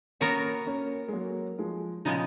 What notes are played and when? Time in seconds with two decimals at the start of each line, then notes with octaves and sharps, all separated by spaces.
0.20 A#3 B3 C#4 F#4 A#4 C#5
0.67 A#3 C#4
1.08 G#3
1.13 F#3 A#3
1.59 F3 G#3
2.05 A#2 C#3 F3 G#3 B3 D#4